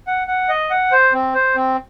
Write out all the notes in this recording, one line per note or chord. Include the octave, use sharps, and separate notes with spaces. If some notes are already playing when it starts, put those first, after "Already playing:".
F#5
F#5
D#5
F#5
C5
C4
C5
C4